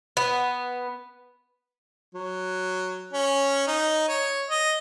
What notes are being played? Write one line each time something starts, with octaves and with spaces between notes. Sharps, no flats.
B3
F#3
C#4
D#4
C#5
D#5